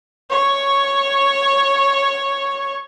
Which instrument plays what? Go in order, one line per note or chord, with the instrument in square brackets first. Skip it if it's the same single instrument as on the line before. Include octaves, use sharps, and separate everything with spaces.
[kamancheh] C#5 C#6